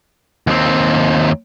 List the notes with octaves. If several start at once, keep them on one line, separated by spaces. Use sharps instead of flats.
D#2 C4